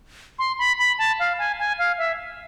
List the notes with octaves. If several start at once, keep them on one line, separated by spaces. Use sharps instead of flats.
C6
B5
B5
A5
F5
G#5
G#5
F5
E5